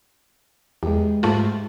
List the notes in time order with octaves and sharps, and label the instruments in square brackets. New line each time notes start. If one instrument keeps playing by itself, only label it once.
[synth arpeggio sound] E2 [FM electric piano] G#3 G4
[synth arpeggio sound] G#2 A3 F4